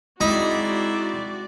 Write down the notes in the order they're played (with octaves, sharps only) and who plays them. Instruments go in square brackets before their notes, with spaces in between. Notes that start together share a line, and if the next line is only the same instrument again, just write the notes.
[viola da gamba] G#3 C4 [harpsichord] D#4 [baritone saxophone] E4 [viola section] F#4 D5